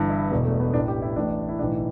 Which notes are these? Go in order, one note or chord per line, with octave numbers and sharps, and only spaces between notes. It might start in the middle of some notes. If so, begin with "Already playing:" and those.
Already playing: G1 G2 E3
E4
E1 E2 B2 B3
A3
B3
A1 A2 E3 D4
G4
E4
A1 A2 E3 D4
E4
B1 A2 E3 D4